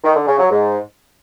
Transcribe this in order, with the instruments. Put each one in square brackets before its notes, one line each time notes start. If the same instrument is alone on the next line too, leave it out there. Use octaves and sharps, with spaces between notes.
[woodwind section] D#3
D3
C#3
F#3
G#2